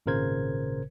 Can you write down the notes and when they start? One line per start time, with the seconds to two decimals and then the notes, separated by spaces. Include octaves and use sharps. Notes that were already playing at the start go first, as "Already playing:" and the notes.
0.06 G#1 A#2 C#3 A#4 C5 G#6